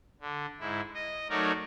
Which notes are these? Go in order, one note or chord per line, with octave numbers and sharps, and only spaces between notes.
D3
G#2 E4
D#5
F#3 A3 D#4 A#4 C#5 D5